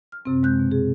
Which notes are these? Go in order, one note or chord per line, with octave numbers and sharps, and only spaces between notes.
F6
F#2 C3 C4
G#3 F#6 G6
B2
G#4